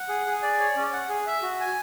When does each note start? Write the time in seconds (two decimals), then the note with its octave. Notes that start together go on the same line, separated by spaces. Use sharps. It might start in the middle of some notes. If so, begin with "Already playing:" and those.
Already playing: F#5
0.09 G#4
0.26 G#4
0.42 D5
0.60 C#5
0.76 C#4
0.93 F#5
1.09 G#4
1.27 E5
1.42 F#4
1.60 G#5